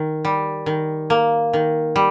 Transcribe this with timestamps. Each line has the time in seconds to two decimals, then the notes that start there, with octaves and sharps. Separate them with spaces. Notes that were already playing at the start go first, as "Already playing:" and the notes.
Already playing: D#3
0.25 G3
0.66 D#3
1.10 A#3
1.53 D#3
1.96 G3